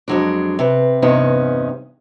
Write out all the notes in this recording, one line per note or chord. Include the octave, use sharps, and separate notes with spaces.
F2 G#2 F#3 G#3 D4
C3 B4
E2 G2 C3 B3 C#4 D#4